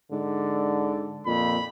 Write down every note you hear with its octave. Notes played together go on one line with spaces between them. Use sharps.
G#2 D3
F2 A#2 B5